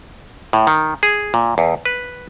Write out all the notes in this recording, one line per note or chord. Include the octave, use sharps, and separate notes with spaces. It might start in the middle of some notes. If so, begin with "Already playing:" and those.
A2
D#3
G#4
A#2
E2
B4